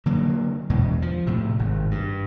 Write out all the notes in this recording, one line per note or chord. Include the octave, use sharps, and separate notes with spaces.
D3 F#3 A#3
E2 B2 G#3
F3
A2 C3
G#1
G2